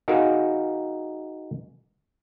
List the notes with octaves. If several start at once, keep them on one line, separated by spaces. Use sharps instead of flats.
D#4 F#4 G#4 A#4 F5